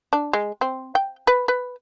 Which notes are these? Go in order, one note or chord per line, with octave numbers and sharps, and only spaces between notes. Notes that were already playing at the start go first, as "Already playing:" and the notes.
D4
G#3
C4
G5
B4
B4